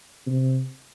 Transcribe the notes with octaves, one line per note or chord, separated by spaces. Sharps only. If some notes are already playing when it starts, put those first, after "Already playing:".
C3